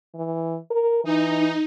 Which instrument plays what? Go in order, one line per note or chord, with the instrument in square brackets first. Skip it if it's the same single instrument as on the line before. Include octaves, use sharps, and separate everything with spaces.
[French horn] E3
A#4
[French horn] E3 [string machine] D#4